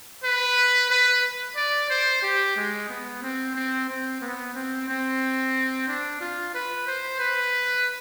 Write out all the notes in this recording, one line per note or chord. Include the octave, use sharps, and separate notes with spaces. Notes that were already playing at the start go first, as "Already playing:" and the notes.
B4
B4
D5
C5
G4
G#3
B3
C4
C4
C4
B3
C4
C4
D4
F4
B4
C5
B4